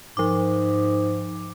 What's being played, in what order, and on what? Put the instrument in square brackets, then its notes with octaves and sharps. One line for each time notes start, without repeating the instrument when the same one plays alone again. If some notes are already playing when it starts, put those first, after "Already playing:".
[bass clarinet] G#2 [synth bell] F3 D6